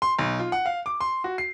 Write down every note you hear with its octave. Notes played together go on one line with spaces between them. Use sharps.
C6
B1
F4
F#5
F5
D6
C6
F#4
C7